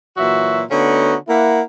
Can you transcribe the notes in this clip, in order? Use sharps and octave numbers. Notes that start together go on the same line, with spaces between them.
A#2 E3 F#3 F#4 E5
D3 A3 B3 C#4 D#4 F#4
A#3 E4 F#5